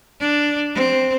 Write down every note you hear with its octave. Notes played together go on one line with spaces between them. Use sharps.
D4
C4